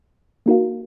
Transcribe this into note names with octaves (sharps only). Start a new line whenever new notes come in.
A#3 D#4 F#4 A#4 F5